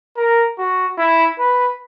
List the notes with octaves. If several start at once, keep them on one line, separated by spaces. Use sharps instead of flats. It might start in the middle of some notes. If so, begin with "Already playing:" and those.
A#4
F#4
E4
B4